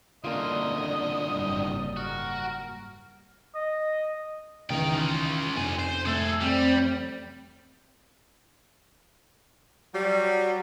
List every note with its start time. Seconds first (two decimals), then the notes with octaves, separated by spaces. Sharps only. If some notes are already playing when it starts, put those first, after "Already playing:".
0.24 C2 D3 A#3 C#4 F4 D#5
1.30 F#1 G#2 G3
1.97 F#4 A#4
3.55 D#5
4.70 C#2 D#3 E3 D#4 G5
4.94 C#4 F4
5.56 F1 F4 G#5
5.79 C5
6.06 F1 A3 G#4 A4 A6
6.41 G3 C4
9.93 F#3 G3